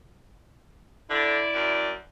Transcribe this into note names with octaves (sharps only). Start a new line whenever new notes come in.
D3 E4 D5
F#2